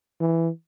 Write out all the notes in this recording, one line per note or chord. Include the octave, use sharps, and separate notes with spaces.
E3